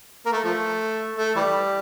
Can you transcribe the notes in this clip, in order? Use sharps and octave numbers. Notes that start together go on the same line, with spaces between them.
A#3
A3
F3 A3
A3
E3 G3